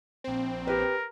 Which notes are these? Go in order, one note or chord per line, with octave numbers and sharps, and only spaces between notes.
A#1 C4
G4 A#4 B4